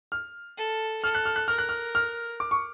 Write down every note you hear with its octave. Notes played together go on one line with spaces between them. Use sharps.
F6
A4
A4 F6
F#6
F6
F#6
A#4 F6
F#6
F6
F6
D6
C#6